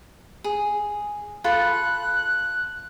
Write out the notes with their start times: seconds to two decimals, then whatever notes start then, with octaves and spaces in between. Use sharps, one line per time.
0.44 G#4
1.44 F4 A4 B5 F#6